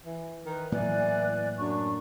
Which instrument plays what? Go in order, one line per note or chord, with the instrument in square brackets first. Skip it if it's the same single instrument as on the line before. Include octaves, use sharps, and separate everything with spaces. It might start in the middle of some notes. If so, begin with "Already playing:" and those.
[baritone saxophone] E3
[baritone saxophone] D#3 [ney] B4
[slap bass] A2 F#3 A#3 [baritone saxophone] E3 [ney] D5 [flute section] G#5 F#6
[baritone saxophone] F#2 [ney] D4 [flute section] C#6